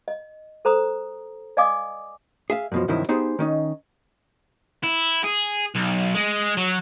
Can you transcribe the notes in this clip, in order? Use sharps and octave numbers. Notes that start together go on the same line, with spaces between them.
D#5
A4 C5 A#5 D#6
D5 D#5 F5 G#5 D6 D#6
G#4 E5 F5
F#2 B2 F3
G2 C3 D#3 F3 F#3 E4
B3 D#4 G4 G#4 C5
D#3 C#4 D#4
E4
G#4
B1
G#3
F#3